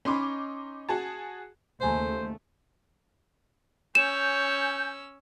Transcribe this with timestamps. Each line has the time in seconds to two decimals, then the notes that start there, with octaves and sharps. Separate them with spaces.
0.05 C#4 D#4 B5 C6 D6
0.89 F#4 G#4 A5
1.81 D#2 C#3 A3 C5 F5 G#5 A#5
3.95 C#4 C#5 G#5 E6 G6 E7